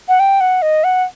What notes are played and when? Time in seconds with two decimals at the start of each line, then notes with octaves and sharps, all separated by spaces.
0.08 F#5
0.20 G5
0.41 F#5
0.62 D#5
0.84 F#5